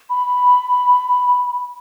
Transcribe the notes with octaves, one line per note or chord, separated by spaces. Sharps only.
B5